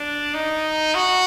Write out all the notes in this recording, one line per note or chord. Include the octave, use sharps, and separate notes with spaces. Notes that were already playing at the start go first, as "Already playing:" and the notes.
Already playing: D4
D#4
F#4